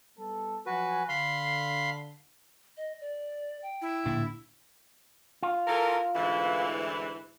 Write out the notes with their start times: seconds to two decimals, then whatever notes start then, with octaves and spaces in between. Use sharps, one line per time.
0.18 G3 B3 A4
0.66 F3 F#3 F#4 B4 G#5
1.09 D3 F5 B5 C6
2.77 D#5
3.01 D5
3.62 G5
3.82 E4
4.06 D1 A#2 D4
5.43 F4
5.68 E3 A4 A#4
6.15 D2 G#2 E3